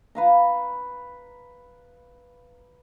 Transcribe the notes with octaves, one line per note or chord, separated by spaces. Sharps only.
B4 F5 A#5